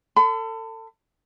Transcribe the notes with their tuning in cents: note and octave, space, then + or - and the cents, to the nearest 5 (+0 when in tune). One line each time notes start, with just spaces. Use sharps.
A4 +30 B5 +45